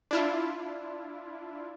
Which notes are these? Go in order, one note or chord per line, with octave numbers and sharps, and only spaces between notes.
D4 E4 F4